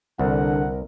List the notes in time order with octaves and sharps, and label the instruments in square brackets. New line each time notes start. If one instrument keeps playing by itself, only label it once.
[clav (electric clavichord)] C2 [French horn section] D3 [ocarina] A#4 [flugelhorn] F#5